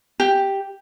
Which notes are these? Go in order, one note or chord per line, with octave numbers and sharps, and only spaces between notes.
G4